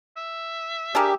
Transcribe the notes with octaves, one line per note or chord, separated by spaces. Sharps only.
E5
D4 G4 G#4 A#4